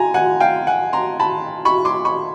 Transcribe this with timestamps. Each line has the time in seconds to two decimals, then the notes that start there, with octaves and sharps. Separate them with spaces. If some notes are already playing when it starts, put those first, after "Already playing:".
Already playing: G#5 A#5
0.14 F#5 G#5
0.40 F5 G5
0.67 F#5 G#5
0.93 A#5 C6
1.20 A5 B5
1.65 B5 C#6
1.85 C6 D6
2.05 B5 C#6